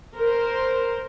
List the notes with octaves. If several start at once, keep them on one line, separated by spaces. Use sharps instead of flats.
A#4 C5